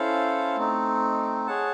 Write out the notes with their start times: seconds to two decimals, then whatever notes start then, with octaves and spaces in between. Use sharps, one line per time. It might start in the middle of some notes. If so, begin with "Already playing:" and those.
Already playing: C#4 E4 A4 C5 F5
0.56 A3 C4 D#4
1.47 G#4 C#5 F#5 A5